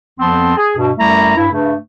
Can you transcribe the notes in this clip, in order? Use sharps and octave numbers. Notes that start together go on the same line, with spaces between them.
F2 F3 B3 C4 A5 C6
G#4
G2 B2
F#2 G3 A3 E4 A#5
G2 E4
G2 C#3 A3